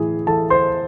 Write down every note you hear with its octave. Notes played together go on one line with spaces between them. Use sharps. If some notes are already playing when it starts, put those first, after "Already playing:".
Already playing: A2 E3 E4 G#4
E3 A4 A5
C5 C6